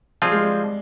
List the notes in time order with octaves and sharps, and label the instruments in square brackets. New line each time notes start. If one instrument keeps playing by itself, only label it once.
[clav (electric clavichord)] F3 C4 F4 G#4 [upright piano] G3
[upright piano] G#3
G3